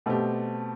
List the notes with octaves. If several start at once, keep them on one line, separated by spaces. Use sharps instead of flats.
B2 A3 C4 G4